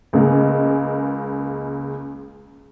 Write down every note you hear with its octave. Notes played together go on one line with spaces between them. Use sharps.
C#2 C#3 G#3 A#3